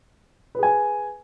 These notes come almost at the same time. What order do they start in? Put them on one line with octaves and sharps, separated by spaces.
B4 G#4 G#5